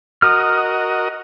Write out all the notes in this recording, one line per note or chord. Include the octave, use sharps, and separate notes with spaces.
F#4 A#4 D#5 D#6 F6